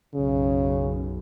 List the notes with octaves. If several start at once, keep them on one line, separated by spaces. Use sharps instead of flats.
B1 F#2 C#3